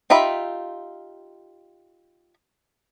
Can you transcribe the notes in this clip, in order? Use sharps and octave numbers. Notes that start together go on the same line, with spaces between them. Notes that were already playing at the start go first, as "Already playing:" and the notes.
D#4 F4 G4 E5 B5